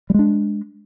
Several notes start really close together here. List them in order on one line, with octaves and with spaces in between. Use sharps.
G3 G#3 D4